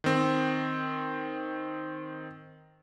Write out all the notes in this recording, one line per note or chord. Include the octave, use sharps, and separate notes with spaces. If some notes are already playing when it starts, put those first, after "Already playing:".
D#3 C4